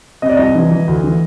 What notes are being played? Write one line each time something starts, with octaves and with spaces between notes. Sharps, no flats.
C3 D#5
D5
C2 D#5
E3
E3
D2
E3